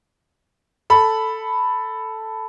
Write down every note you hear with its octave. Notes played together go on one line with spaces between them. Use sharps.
A4 B5